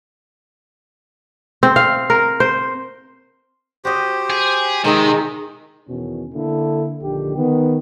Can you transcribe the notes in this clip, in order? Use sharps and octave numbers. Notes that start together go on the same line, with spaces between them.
C4
F5
A#4
C5
F#4 G4 C5 D#5
G#4
C3 D#3 G#3 A4 D#5
E2 B2 D#3 C#4
D3 A#3 E4 A4
A#1 D3 D#3 G4
D#3 B3